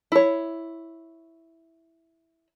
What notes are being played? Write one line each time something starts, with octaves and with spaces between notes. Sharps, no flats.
E4 C#5